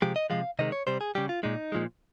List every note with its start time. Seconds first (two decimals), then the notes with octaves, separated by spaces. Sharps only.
0.02 C3 F3 G#3 G4
0.16 D#5
0.30 C3 F3 G#3 F5
0.59 C3 D#3 G#3 D#5
0.72 C#5
0.87 C3 G3 C5
1.01 G#4
1.15 C#3 G3 G4
1.29 F4
1.43 A#2 G#3 D#4
1.72 A#2 F3 G#3